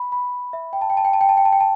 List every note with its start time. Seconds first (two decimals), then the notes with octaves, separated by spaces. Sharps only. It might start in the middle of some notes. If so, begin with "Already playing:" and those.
Already playing: B5
0.12 B5
0.53 E5
0.73 G5
0.81 A5
0.90 G5
0.97 A5
1.05 G5
1.13 A5
1.21 G5
1.29 A5
1.37 G5
1.45 A5
1.53 G5
1.60 A5